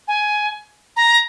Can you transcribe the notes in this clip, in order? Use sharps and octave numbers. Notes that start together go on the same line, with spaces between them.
G#5
A#5